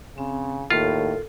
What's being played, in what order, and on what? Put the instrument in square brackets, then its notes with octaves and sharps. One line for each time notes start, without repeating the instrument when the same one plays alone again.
[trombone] C#3 [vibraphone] C4
[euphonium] D#2 [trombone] A2 [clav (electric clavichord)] F4 [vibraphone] A4 A#4